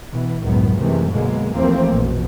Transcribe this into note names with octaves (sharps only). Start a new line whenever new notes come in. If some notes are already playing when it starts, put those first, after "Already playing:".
B2 E3
C#2 F#2 A2 D#3 F#3 B3
F#2 C3 D#3 E3 G#3 A3
B2 D3 F#3 G#3 A#3
D#2 E3 F3 A3 A#3 C4
A#1 F2 B2